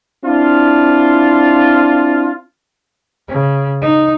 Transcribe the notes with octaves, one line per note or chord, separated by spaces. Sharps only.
C4 D4 E4 F4
C#3
D#4